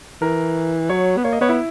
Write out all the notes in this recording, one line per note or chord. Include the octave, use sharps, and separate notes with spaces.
E3 A#4
F#3 C#5
B3
A#3 C#5
D#5
B3 C#5
E4